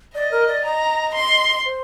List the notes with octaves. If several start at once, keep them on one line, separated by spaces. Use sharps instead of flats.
D5 D#5
A#4
D5
D#5 A#5
C6
C5